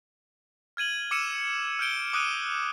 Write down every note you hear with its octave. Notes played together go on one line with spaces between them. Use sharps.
F6 G#6 D#7 F#7
D6 E6 C#7 D#7 E7
F6 G6 D7 G7
D6 D#6 F#6 D7 D#7